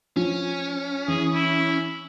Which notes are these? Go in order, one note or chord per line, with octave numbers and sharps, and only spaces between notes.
F3 C#4
E3 G#4
E4